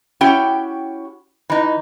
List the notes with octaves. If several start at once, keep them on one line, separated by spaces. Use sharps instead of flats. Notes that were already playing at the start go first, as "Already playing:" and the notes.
C#4 E4 F#4 G4 G5
E3 D#4